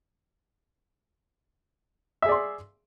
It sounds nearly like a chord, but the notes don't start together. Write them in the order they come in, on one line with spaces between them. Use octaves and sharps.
E5 G#4 D5 C6